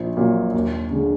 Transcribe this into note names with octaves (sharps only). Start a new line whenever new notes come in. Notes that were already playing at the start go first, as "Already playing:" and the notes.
Already playing: A#1
A#2 F#3
D#2
D3 G#3